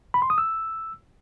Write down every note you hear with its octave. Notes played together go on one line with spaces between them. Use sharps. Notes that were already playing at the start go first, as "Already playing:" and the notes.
B5
C6
D#6
E6